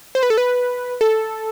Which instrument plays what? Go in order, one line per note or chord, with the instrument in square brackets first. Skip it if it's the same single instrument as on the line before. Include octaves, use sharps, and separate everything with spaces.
[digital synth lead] C5
B4
A4
B4
A4